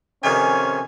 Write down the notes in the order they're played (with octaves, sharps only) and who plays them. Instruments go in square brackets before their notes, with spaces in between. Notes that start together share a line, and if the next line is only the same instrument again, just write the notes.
[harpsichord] F2 C3 D#3 [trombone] C#4 [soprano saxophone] G#5